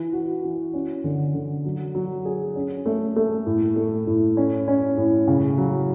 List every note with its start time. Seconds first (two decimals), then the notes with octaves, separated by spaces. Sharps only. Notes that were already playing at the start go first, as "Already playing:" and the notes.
Already playing: E3
0.13 F#4
0.44 E3
0.74 C#4
1.04 D3
1.34 D3
1.65 F#3
1.95 F#3
2.25 G#4
2.55 C#4
2.86 A3
3.16 A3
3.46 A2
3.76 A3
4.07 A2
4.37 C#4
4.68 C#4
4.97 A2
5.28 C#3
5.58 F#3